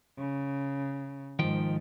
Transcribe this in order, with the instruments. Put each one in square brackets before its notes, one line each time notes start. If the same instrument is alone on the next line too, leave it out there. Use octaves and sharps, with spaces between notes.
[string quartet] C#3
[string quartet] G#2 [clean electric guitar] D#3 F3 G5